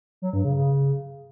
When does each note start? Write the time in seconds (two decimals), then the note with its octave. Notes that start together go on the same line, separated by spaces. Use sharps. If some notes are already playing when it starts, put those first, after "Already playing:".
0.22 F#3
0.33 G2
0.44 C#3
0.56 C#3